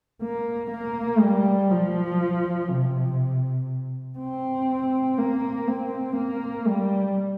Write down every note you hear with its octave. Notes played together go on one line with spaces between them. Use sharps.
A#3
A#3
G3
F3
C3
C4
A#3
C4
A#3
G3